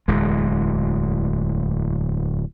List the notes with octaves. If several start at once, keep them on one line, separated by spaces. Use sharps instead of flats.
D1 E2 G#3